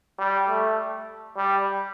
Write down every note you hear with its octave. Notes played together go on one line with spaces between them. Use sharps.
G3
A3
G3